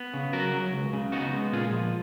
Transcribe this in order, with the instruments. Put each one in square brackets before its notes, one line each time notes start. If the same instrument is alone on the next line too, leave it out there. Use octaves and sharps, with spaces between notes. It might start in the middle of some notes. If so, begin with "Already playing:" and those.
Already playing: [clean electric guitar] B3
C#3
F#3 F#4 A#4
F#3
C#2
C#3
B3 D#4 F#4
G#3
A#2 F4 G#4
F3